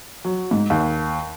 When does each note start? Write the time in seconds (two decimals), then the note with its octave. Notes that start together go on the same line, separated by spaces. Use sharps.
0.25 F#3
0.51 G#2
0.70 D#2